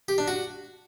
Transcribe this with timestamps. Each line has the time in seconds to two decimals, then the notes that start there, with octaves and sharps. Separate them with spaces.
0.08 G4
0.18 D4
0.28 F#4